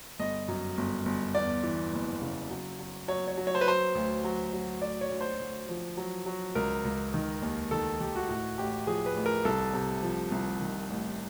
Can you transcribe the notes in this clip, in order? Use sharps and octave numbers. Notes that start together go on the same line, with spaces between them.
G1 D#5
F#2
G1
G1
E2 D5
E3
F#1
C#3
F#3
F#3
F#3 C#5
C#5
F#3
C#5
C5
B4
F#3 C5
D2
F#3
F#3
D2 D5
C#5
D2
C5
D2
F3
F#3
F#3
C#2 A#4
C#2
D#3
D#2
D#3 A4
D#3 G4
F#4
A2 F#4
A1 G4
F3 G#4
B4
A1
A#4
C2 A4
C3
F3
C2
D#3
A1